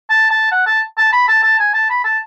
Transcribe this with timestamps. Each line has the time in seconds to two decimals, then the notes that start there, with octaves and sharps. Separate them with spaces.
0.10 A5
0.31 A5
0.52 F#5
0.67 A5
0.98 A5
1.13 B5
1.29 A5
1.43 A5
1.59 G#5
1.74 A5
1.90 B5
2.05 A5